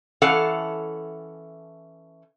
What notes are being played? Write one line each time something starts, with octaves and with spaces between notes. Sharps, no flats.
E3 C#4 A4 F5 F#5